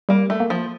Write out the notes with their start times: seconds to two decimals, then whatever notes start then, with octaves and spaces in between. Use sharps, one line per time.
0.09 G3 A#3
0.30 A3
0.40 A#3
0.50 F3